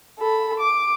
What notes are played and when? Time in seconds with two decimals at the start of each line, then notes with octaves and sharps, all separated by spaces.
0.19 A4 B5
0.60 D6